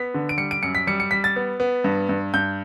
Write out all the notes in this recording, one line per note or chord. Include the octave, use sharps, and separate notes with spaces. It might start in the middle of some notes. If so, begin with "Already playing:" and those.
Already playing: B3 B6
D3
D7
G3 C#7
D7
F#2 C#7
B6
G3 C#7
C#7
G3 B6
A6
B3
B3
G2
G2
G2 G6